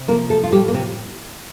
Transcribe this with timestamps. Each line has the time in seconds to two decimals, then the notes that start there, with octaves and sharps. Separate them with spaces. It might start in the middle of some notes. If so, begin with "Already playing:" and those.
Already playing: C3
0.08 F3 A#3 A#4
0.30 A3 A4
0.43 F4
0.52 A2 G3 G4
0.68 A#3
0.74 C3 C4